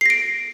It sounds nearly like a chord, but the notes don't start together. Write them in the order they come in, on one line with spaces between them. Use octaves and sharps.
C7 A#6 D7